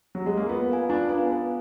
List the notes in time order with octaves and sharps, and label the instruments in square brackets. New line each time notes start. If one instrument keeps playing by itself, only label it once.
[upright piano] F#3
G#3
A#3
[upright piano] B3 [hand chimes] F4
[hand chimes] A#4 F5 G#5
[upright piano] D4 [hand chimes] F4
[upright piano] B3 [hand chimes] A#4 F5 G#5
[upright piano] B3 [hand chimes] G#4